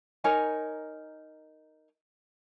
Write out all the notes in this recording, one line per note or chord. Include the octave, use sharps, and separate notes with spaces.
D#4 A#4 C#5 G#5